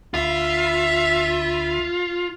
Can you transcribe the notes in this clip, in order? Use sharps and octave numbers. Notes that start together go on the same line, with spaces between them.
D2 F4 E5 B5